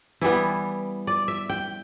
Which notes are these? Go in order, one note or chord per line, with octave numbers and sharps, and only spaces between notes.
E3 G3 B3 E4
D5
E5
G5